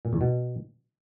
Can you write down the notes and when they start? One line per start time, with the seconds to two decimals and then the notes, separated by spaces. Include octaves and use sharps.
0.05 A#2
0.13 E2
0.21 B2